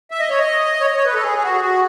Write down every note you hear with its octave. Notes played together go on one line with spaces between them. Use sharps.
E5
D#5
C#5
D#5
C#5
D#5
C#5
B4
A4
G#4
G#4
F#4
G#4
F#4